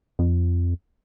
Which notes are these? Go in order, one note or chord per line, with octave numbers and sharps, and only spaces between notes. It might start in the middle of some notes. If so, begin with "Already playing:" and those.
F2